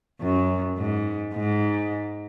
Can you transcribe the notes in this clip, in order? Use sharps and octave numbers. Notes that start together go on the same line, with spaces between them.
F#2
G#2
G#2